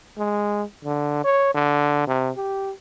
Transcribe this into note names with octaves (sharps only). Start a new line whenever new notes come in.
G#3
D3
C#5
D3
C3
G4